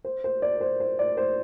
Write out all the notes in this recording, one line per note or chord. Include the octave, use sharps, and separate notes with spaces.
C5
C5
D5
C5
C5
D5
C5